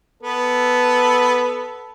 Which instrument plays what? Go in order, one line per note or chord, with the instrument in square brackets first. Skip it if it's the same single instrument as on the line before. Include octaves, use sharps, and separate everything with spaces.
[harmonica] B3 [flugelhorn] A4